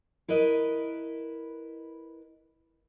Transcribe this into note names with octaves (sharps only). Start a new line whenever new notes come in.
E4 A#4 B4 D#5